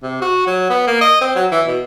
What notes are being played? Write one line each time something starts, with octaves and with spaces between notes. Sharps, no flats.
C3
F#4
F#3
B3
A#3
D#5
C4
F#3
E3
B2